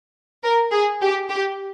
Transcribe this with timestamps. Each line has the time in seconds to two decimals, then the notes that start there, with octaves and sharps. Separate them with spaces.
0.43 A#4
0.72 G#4
1.01 G4
1.29 G4